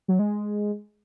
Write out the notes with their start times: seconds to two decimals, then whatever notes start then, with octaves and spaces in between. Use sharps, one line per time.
0.08 F#3
0.19 G#3